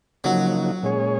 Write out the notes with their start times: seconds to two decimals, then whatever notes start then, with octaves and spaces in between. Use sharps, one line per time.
0.24 C#3 F3 F#3 A#3 D#4 F#4
0.83 A#2 G#3 C#4 G#4 C#5